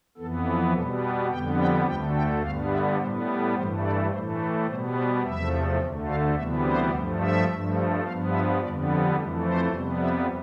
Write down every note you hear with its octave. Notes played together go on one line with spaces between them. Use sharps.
F2 E3 B3 A4
A4
B2 G3 B3 A4
B4
F2 D3 G3 B3 G5
G5
D2 D3 A3 G5
G5
G2 D3 G3 B3 F5
E5
A2 G3 B3 C5
B4
G2 E3 A3 C5
D5
A2 E3 A3 C5
B4
B2 G3 B3 C5
C5
E2 C3 F3 A3 E5
D2 D3 A3
F5
D2 C3 E3 G3 B3 E5
C5
G2 F3 A3
E5
G2 F3 A3
G2 F3 B3 F5
E5
F2 D3 G3 B3 D5
B4
F2 E3 A3 A4
C5
F2 C3 G3 B3
E5